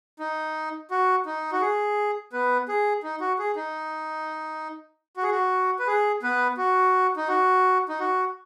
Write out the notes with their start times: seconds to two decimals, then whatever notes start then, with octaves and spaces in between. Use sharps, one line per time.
0.19 D#4
0.91 F#4
1.26 D#4
1.52 F#4
1.61 G#4
2.33 B3 B4
2.68 G#4
3.03 D#4
3.20 F#4
3.39 G#4
3.56 D#4
5.17 F#4
5.23 G#4
5.31 F#4
5.79 B4
5.87 G#4
6.23 B3 B4
6.57 F#4
7.17 D#4
7.28 F#4
7.89 D#4
8.00 F#4